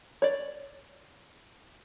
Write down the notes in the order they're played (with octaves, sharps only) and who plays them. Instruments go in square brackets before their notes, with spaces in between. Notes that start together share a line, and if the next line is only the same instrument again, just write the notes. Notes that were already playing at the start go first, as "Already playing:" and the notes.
[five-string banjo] C#5 D5